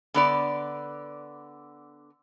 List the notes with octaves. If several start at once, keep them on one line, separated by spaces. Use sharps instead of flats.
D3 B3 D5